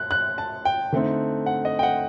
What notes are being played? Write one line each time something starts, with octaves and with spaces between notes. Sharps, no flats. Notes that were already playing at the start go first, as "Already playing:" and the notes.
Already playing: F#6
F#6
A5
G5
D3 A3 C4 D#4
F#5
D#5
G5
F#5